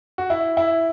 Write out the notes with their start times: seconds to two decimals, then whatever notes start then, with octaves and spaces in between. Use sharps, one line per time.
0.18 F#4
0.30 E4
0.57 E4